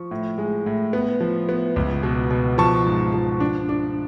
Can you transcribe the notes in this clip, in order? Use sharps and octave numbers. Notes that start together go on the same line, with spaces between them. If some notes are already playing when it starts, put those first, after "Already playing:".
Already playing: F3 C#6
A2
G#3
A2
B3
F3
B3
C#2
B2
B2
F3 A5 C#6
G#2
F3
D4
D4